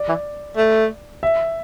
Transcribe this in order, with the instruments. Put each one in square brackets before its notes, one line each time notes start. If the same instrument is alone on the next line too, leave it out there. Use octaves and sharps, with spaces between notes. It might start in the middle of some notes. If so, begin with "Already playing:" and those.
Already playing: [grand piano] D5
[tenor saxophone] E3
A3
[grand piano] E5